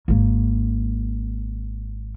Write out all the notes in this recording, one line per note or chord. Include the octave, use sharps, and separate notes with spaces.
G#1 A#3